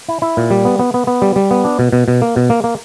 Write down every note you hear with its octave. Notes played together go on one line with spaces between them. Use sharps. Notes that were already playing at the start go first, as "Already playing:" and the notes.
E4
E4
A#2
G3
B3
B3
B3
B3
G3
G3
B3
D4
B2
B2
B2
A#3
B2
A#3
A#3